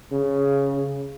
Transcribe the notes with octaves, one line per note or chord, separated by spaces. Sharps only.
C#3